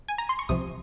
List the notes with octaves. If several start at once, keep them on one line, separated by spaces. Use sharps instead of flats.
G#5
A#5
C6
C#6
C2 C3 F3 D#6